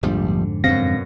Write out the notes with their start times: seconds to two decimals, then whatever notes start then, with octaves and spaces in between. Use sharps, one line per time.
0.03 A#1 F2 G#2 D3 F3 G3
0.64 F#2 B2 C4 F5 A#6